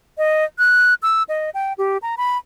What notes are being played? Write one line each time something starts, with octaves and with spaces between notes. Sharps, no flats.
D#5
F#6
E6
D#5
G5
G4
A#5
B5